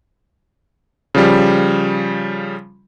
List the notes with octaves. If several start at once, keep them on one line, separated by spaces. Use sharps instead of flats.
C#3 F3 G3